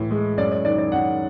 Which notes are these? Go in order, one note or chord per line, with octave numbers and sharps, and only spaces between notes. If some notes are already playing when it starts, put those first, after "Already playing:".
Already playing: A2 E3
G#3
F#2 D5
D5
D#3 D5
D5
F#2 F#5